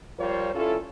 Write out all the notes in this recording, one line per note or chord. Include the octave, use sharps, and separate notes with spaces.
F3 G3 F4 A#4 C5 C#5
G2 C#4 E4 F4 A4